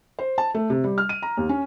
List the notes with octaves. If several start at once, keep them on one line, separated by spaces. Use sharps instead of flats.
C5
A5
A3
C3
G3
F6
D#7
A#5
D#2
C#4